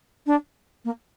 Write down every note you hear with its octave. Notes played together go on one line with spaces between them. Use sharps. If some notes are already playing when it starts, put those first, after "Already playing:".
D4
A#3